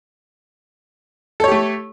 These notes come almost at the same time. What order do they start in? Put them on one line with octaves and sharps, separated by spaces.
A4 C#5 G4 A3